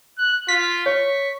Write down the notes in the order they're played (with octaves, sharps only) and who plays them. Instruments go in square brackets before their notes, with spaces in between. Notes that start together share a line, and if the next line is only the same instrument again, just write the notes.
[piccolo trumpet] F#6
[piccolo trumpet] F4 [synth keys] B6
[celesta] C#5 [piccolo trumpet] C#6